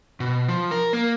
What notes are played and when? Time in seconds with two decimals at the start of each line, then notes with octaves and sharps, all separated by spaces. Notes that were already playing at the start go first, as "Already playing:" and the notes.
0.20 B2
0.48 F3
0.71 A#4
0.93 A#3